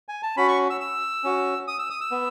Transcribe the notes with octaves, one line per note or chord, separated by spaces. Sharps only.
G#5
A5
C#4 F#4 B5
C#6
E6
E6
C#4 F#4
D#6
E6
D#6
E6
B3